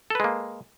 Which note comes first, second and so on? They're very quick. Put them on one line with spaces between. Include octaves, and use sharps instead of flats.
A4 B4 G#3 A#3